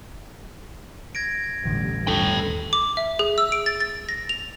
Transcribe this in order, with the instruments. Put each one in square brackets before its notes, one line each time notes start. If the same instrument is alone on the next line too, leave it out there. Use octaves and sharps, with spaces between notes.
[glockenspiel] G#6 A#6 D7
[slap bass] E1 D3 [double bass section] A1 G3
[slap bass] D#2 D3 D4 [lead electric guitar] A4 G5
[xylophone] D6
E5
G#4
E6
D7
A6
A6
A#6
F7